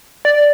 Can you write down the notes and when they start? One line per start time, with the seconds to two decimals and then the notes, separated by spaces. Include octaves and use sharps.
0.25 D5